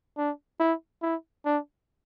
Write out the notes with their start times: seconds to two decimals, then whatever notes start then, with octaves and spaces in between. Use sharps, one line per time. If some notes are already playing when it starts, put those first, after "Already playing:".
0.18 D4
0.60 E4
1.02 E4
1.45 D4